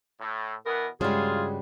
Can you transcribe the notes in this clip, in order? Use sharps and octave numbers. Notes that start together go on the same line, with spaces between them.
A2
B2 E3 B3 A#4
G2 C#3 G3 G#3 F4 F#4 G#4